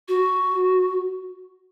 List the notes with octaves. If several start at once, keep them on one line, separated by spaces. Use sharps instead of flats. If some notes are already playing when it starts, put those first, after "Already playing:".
F#4